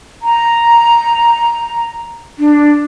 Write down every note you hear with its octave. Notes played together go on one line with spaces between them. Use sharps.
A#5
D4